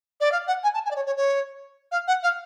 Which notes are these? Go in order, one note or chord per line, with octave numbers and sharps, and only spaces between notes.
D5
F5
F#5
G#5
A5
G#5
D5
C#5
C#5
C#5
F5
F#5
F5